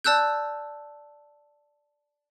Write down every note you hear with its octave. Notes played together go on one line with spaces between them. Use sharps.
D5 A5 E6 F#6 G6